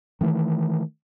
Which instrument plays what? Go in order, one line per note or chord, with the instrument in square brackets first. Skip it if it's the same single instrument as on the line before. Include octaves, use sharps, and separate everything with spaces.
[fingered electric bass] D#3 E3 A3